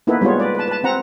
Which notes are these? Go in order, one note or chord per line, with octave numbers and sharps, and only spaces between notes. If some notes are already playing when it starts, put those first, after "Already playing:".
A#3 B3 D#4 E4 A4 B4
G3 G#3 B3 F4 C#5
B4 D5
B4 A5
B4 A5
C4 F#5 A#5